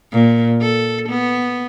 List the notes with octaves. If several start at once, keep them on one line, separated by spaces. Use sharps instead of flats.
A#2
A4
B3